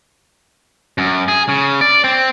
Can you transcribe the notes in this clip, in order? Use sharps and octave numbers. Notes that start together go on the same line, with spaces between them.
F#2
G#4
C#3
D5
C4